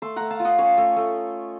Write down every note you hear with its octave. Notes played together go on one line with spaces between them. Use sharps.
A3 A5 C6
A3 F#5 A#5
F5 A5
F4
D#5 F#5
C#4 C#5 F5
A3
A3